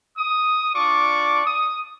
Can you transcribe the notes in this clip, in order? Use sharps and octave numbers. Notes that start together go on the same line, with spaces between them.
D#6
D4 F4 D5 C#6 D6
D#6